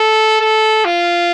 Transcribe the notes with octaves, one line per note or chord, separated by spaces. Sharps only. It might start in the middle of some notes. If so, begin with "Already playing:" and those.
Already playing: A4
A4
F4